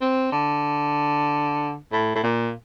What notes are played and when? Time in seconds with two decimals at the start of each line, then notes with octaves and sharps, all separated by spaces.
0.01 C4
0.32 D3
1.92 A2
2.15 A2
2.24 A#2